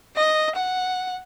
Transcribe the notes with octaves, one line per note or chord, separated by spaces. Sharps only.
D#5
F#5